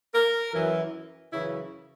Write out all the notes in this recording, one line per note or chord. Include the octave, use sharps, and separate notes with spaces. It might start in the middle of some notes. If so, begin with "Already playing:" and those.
A#4
F#2 E3
F#2 C#3 E3 E4